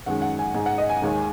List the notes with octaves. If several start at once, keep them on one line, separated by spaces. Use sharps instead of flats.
F#2 D#3 G#3 F#5
F#5
G#5
G#2 G#3 G#5
F#5
D#5
G#5
D#2 D#3 G#3